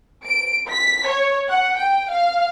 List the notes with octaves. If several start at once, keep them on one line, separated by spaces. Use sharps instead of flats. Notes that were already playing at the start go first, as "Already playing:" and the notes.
D7
B6
C#5
F#5
G5
F5